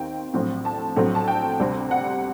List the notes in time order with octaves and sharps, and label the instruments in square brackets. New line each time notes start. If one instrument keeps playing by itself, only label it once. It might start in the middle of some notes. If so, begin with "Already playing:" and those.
Already playing: [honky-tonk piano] D#2 D#3 C4 G5
A#1 A2 F#3 A3 C4
A5
A#1 A2 F#3 A3 C4
A5
G5
D2 C3 G3 C4
F#5